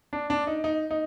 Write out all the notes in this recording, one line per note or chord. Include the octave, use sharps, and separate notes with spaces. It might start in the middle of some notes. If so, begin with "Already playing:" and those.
D4
D4
D#4
D#4
D#4